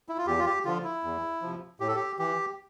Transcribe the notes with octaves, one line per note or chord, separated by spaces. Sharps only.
E4
F4
E2 G4
F4
G4
D3 F3 F4
E4
E2
C3 F3
A2 G4
A4
G4
E3 G4